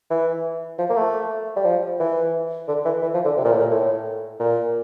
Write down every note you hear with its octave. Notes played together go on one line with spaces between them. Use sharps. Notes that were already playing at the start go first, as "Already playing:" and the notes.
E3
F3
A#3
A3
G3
F3
E3
D3
E3
E3
F3
D3
C3
A#2
A2
A#2
A2
A#2